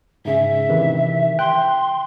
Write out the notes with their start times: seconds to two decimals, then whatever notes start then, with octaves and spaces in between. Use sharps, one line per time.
0.25 G#2 C#3 C#4 E5
0.70 C3 D#3 E3
1.39 G5 C6 F#6